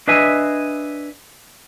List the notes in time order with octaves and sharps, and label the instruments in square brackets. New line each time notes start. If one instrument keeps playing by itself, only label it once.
[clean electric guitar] D4 B4 D#5 E5 G#5